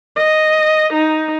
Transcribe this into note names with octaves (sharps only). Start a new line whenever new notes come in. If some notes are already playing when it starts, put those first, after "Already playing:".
D#5
D#4